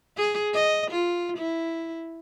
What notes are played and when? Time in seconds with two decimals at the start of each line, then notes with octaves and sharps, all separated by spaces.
0.17 G#4
0.53 D#5
0.91 F4
1.37 E4